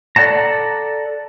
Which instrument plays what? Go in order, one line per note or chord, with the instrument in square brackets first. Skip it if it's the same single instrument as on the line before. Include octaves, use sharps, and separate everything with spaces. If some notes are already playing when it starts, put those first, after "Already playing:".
[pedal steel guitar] A4 D5 F#5 A5 A#5